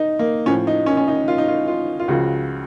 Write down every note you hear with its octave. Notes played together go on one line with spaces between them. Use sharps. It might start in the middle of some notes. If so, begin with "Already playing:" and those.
Already playing: D#4
A#3
A2 F3 C#4
D#4
C#4
C#4
D#4
F4
D#4
F4
F4
F4
C#2 C#3 F3 F#4